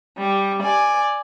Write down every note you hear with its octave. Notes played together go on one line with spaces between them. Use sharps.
G3
D5 G#5